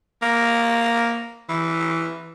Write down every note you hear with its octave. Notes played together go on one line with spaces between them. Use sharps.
A#3
E3